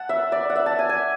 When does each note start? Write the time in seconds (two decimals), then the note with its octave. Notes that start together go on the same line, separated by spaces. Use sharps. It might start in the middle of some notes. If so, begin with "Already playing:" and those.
Already playing: F#5 A5
0.09 E5
0.32 D5
0.50 F#5
0.56 E5
0.66 A5
0.79 G#5
0.89 G#5